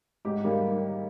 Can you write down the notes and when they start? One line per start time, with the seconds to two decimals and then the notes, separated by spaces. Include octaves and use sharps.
0.25 G#2 G4
0.44 D#3 G3 A#3 G4